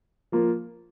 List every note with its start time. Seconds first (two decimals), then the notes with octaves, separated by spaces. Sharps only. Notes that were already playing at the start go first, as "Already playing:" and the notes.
0.32 F3 A#3 F4